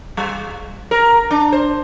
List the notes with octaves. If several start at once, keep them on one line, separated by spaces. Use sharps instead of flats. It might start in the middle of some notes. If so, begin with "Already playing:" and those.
G3
A#4
D4
C5